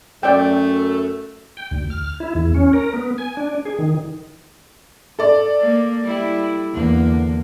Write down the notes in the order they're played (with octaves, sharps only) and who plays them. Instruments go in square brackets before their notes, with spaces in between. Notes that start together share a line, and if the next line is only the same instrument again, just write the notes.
[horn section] F#2 A3 [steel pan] D5 G5
[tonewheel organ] G5
D2
F6
E4
E2
C#4
A#4
B3
G#5
D4
G#4
D#3
[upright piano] A4 D5
[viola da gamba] A#3
G3 E4
[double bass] E2 D3 [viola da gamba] A#3